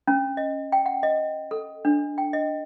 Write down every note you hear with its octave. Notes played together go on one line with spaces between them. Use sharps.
C#4
D#5
G5
F#5
D#5
A4
D4
G5
D#5